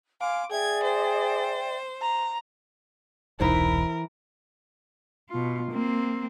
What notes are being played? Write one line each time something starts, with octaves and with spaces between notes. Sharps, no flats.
F5 G#5 C6 D6
G#4 D5 E5 G5 G#6
C5
A#5
E1 C2 E3 D#4 E4 A#4 C5 B5
B2 F4
A#3 C4